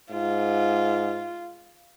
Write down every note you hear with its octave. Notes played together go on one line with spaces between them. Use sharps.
G#2 F4